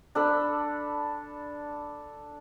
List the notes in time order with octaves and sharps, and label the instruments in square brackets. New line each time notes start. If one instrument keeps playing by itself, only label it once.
[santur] D4 A4 B5